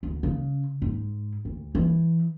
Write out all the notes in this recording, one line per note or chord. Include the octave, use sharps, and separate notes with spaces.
D2
C#3
G#2
D2
E3